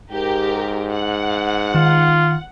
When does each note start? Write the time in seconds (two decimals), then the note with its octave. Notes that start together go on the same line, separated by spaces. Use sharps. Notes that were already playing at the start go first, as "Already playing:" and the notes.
0.11 G#2 G4 A#4
0.91 F#5
1.75 D#3 F4